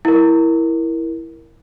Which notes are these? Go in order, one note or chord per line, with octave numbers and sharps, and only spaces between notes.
E4 A#4